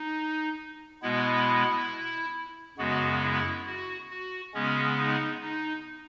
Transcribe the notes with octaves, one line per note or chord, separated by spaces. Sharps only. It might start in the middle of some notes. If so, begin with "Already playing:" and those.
Already playing: D#4
B2 G#3 B3 E4
F#2 C#3 G#3 B3 F#4
E4
F#4
F#4
C#3 G#3 B3 C#4
D#4
D#4